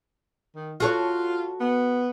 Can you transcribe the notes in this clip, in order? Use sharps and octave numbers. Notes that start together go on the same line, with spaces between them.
D#3
F4 F#4 A4 C#5
B3